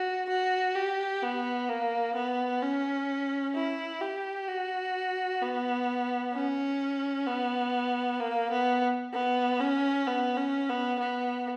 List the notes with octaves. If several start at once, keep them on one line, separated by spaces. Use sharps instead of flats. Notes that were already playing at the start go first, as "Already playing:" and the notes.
Already playing: F#4
F#4
G4
B3
A#3
B3
C#4
E4
G4
F#4
B3
C#4
B3
A#3
B3
B3
C#4
B3
C#4
B3
B3